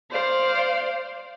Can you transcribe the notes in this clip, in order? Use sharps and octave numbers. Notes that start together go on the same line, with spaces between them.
C5 D5 F5